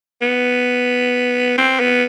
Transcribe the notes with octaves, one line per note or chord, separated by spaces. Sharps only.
B3
C4
B3